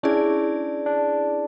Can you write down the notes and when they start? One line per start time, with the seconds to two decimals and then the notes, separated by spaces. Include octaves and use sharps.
0.03 C#4 D4 E4 G#4 D5
0.86 D4